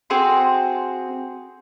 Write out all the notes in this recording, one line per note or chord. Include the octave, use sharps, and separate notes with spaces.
C4 F#4 G#4 C6